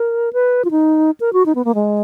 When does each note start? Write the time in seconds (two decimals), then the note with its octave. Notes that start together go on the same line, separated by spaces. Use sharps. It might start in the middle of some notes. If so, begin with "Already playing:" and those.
Already playing: A#4
0.33 B4
0.65 F4
0.71 D#4
1.20 A#4
1.33 F#4
1.46 D#4
1.55 B3
1.65 A#3
1.75 G#3